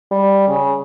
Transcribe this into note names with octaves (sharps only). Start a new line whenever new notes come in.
G3
C#3